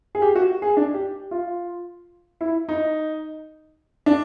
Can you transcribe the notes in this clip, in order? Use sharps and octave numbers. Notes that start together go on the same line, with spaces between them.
G#4
G4
F#4
G#4
D4
G4
F4
E4
D#4
D4